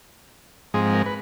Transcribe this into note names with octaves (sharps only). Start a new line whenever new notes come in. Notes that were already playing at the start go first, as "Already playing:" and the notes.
G#2 F3 G#3 C4 G#4
A#4
B4